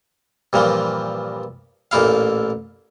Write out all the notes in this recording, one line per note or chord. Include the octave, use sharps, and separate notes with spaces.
G2 A#2 E3 F3
A1 A#2 A3 E4 F5